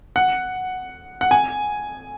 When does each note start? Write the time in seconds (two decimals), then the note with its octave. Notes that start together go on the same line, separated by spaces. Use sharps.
0.16 F#5
1.21 F#5
1.31 G#5